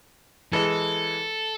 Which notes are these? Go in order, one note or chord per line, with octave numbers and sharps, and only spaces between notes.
E3 G#3 A4